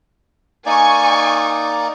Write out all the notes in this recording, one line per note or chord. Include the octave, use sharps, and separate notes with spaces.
A#3 D#4 D5 G#5 C#6